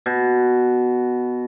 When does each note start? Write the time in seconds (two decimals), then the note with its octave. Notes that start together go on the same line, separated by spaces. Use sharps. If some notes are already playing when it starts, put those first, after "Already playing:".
0.06 B2